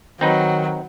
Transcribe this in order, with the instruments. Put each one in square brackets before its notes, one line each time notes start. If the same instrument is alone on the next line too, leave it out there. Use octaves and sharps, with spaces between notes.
[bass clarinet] D#3 [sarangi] F#3 [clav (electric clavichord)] C4 D#4 B4